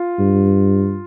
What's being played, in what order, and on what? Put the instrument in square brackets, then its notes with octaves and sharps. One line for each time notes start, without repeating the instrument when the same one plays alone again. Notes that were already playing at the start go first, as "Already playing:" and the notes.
Already playing: [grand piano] F4
[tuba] G2